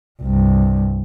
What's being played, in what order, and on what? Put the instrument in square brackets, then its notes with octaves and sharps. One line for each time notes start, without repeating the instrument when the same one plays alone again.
[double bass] C2 G2